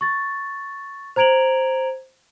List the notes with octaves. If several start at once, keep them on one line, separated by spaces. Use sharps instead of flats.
C#6 A6
C5 A#5 G#6 D7 F7 F#7